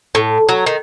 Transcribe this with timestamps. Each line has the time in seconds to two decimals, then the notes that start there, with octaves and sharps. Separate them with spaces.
0.15 A2
0.49 F#3
0.66 D#3